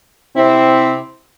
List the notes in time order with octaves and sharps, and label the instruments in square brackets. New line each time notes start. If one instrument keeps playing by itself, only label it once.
[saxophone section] C3 E4 [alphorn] C4